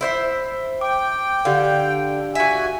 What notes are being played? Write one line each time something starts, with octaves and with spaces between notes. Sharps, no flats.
E4 C5 E5
G5 D6
D3 G4 F5
F#4 E5 G#5